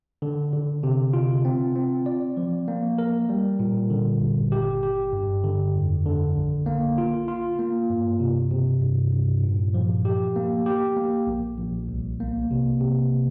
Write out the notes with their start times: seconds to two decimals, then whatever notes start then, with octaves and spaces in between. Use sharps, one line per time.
0.22 D3
0.53 D3
0.83 C3
1.13 F4
1.45 C4
1.76 C4
2.06 D5
2.37 F3
2.68 A#3
2.98 A#4
3.29 G3
3.59 A#2
3.90 D3
4.21 G1
4.52 G4
4.83 G4
5.13 G2
5.44 D3
5.75 F2
6.06 D3
6.36 A#1
6.66 A#3
6.98 F4
7.28 F4
7.59 A#3
7.90 G2
8.20 C3
8.51 C3
8.81 G2
9.12 G2
9.43 A#2
9.74 F3
10.05 G4
10.36 A#3
10.66 G4
10.96 A#3
11.27 A#1
11.58 A#1
11.88 C2
12.20 A#3
12.51 C3
12.81 C3